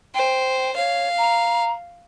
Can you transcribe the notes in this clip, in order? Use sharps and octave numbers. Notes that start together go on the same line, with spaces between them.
C5 G5
C#5 F5
A#5